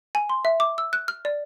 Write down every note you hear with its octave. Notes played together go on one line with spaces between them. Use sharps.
G#5
C6
E5
D6
E6
F#6
F6
D5